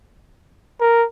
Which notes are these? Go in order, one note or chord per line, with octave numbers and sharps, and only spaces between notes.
A#4